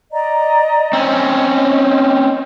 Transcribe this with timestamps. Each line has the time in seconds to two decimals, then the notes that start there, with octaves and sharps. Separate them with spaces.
0.12 D5 D#5 A#5
0.93 C4 C#4 D#5